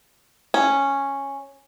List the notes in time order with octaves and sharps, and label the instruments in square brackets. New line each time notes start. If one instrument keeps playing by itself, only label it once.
[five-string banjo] C#4